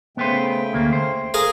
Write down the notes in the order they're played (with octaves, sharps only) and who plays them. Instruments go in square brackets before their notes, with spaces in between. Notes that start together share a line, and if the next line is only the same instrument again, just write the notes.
[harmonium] C#3 A3 G5 [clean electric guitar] B3 B4 C5
[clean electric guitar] D2 A#3
C5
[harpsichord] G#4 A#4 F5